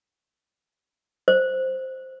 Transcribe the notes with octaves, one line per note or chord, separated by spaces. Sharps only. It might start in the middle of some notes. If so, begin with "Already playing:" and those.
C5